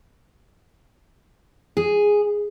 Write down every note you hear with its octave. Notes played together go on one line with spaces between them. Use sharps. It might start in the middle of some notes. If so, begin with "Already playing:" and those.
G#4